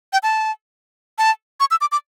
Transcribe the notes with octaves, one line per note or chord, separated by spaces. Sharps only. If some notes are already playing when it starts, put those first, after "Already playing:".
G5
A5
A5
C#6
E6
D6
D6